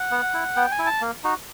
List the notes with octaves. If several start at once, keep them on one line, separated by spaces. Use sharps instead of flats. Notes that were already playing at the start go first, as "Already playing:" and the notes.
Already playing: F#5
B3
E4
B3 G5
G#5
E4
A5
A#3
D#4 F#4